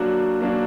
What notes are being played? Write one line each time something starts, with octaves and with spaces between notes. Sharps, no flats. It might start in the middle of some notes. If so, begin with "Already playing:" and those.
Already playing: F#3 A#3 D4 F#4
F#3 A#3 D4 F#4